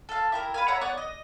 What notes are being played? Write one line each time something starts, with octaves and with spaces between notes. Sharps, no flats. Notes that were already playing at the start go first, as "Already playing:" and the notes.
A4 F5
E4 G4 A#4
B4 F5 G#5
C#5 E5 F#5 A#5
B3 C#5 D5 F#5
D#5